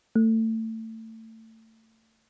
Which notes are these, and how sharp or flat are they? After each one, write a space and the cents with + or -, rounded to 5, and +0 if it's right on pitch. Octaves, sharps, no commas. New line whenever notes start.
A3 +25